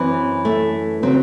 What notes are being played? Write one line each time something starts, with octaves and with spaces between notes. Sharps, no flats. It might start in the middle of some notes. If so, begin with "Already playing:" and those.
Already playing: F#2 E3 C4
A3
C#3 F#3 C4